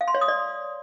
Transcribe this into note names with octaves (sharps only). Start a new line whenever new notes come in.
F5
C6
C#5
D#6
D5